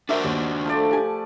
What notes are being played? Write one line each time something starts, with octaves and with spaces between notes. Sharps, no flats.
D4 F#4 A#4 C5 E5
D#2
F3 A3 D5
G4 G#5